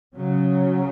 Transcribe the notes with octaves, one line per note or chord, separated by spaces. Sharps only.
C#3 F#3 C#4